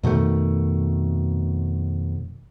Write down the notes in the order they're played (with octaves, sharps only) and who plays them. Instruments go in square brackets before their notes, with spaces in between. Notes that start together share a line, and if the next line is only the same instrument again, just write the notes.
[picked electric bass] F2 B2 D#3 A3